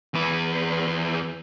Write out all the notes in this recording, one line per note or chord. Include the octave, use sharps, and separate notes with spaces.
E2 B4